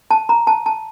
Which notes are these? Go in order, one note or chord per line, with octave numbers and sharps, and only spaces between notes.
A5
A#5
A5
A5